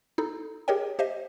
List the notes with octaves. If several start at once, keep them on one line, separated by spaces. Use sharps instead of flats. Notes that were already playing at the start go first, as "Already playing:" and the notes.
D#4 E4 A4
G4 G#4 A#4 C#5 D#5 G5
G4 C5 D#5 E5